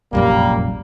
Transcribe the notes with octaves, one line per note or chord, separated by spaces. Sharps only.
F1 A#1 F#2 G3 A#3